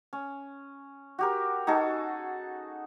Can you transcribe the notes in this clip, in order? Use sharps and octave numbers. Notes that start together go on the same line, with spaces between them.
C#4
F#4 G4 A#4
D#4 F#4 G#4 A4